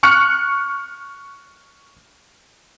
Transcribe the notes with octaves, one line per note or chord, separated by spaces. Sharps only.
C#6 F6 F#6 C#7